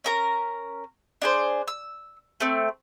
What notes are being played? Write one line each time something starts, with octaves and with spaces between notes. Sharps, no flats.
C#4 A#4 A#5
D4 G#4 C5
E6
A3 C4